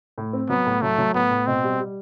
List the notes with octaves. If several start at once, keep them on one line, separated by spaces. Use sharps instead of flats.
A2
C4
F#3 B3
A2
F#3 A3
F#3
A2 B3
A2
B2 C4
G3
G3